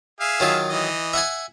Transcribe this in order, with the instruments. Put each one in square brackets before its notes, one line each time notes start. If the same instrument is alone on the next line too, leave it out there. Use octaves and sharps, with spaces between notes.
[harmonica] G#4 E5 F5
[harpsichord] D#3 F#3 F4
[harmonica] E3 D#5
[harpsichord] E5 F#5 G#5